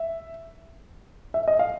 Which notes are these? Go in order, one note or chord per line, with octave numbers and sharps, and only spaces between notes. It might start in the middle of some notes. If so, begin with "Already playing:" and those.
Already playing: E5
E5
D#5
F5